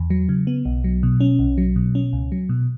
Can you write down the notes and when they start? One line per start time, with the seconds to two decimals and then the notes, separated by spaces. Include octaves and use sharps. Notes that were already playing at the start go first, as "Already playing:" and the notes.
Already playing: E2
0.10 F#3
0.29 C#3
0.47 B3
0.65 B1
0.84 F#3
1.03 B2
1.21 C#4
1.39 B1
1.58 F#3
1.76 B2
1.95 C#4
2.13 C#2
2.32 F#3
2.49 B2